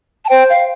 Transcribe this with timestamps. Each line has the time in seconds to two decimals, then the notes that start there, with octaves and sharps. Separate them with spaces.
0.25 A5
0.29 C5 G5
0.50 F5